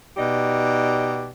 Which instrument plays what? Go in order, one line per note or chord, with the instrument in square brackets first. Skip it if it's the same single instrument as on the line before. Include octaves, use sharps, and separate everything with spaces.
[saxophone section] B2 D#4 G4 D5